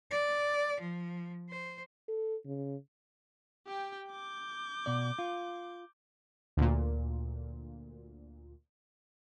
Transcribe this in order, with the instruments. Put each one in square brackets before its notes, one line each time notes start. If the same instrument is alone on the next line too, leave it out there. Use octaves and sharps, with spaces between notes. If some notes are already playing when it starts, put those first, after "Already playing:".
[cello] D5
F3
C5
[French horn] A4
C#3
[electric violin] G4 G5
D6 G6
[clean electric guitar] B2 D5
F4
[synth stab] D2 A#2